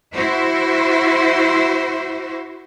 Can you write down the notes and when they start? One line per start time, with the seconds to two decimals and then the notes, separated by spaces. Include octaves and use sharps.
0.13 E4 F#4 C5